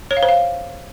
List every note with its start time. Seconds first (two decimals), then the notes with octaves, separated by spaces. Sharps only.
0.11 C#5
0.17 F5
0.23 C5
0.29 F5